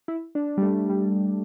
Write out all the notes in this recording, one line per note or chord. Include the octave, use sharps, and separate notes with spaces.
E4
D4
G3
A3
G3